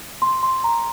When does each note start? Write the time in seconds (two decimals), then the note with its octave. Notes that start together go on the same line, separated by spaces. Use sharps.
0.22 C6
0.43 C6
0.64 A#5